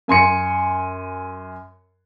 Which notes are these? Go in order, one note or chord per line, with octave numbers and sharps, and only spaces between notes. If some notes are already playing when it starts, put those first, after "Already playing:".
F#2 G#5 C6 C#7